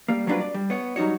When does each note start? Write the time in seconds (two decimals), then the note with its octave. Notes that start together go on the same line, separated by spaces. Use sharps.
0.09 G3 A#3
0.27 F#3 G3 C4 D4 F4 B4
0.41 D5
0.54 G3
0.70 B3 C#5
0.96 F#3 G3 D#4 F#4 C#5